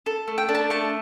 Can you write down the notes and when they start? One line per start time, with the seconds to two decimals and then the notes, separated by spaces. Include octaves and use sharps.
0.06 A4
0.28 A3
0.38 G5
0.49 D4
0.55 A5
0.70 A3 A5